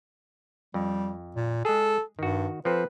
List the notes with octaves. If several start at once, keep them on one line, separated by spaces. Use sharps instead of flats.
F2 G3
A#2
G#3 G#4 A4
G2 D#3 F#4
F3 C4 A4 B4